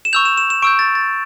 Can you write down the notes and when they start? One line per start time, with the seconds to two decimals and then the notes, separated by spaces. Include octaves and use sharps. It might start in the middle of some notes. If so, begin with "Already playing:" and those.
0.05 E7
0.13 C#6 E6 G6 F7
0.25 E7
0.38 E7
0.50 E7
0.62 C#6 E6 G6 D7
0.79 A6
0.95 A6